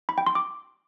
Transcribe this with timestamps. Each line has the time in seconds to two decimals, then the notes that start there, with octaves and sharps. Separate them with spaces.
0.09 B5
0.18 G5
0.26 C6
0.35 D6